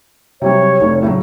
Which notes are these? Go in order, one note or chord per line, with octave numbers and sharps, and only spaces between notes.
C3 F#3 G3 C#5
F1
A2 C#3 F#3